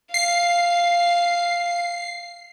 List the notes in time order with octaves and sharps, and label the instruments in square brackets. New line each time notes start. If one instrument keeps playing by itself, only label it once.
[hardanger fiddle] F5 [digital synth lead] C7